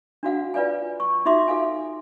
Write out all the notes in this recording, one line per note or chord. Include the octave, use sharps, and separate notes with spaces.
D4 F#4 F5 F#5
F4 B4 D5 F5 G#5
C#6
D#4 F4 F#4 E5 C6 D6
A4 F5 G#5